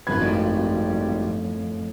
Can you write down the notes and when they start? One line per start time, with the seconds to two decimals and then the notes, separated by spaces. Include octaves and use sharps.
0.07 G#1 F#2 B2 F3 B4 G#6
0.21 F2 A2 G3